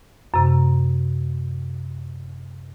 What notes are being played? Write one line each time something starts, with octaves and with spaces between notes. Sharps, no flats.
F#2 C3